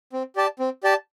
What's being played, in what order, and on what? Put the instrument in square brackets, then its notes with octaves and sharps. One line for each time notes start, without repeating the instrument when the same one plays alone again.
[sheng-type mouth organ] C4
G4 D5 A5
C4
G4 D5 A5